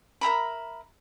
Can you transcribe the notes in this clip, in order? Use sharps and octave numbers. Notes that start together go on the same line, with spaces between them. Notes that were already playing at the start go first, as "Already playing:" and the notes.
A#4 E5 A#5 B5